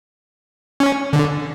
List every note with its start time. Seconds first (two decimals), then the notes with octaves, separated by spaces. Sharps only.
0.80 C#4
1.13 D3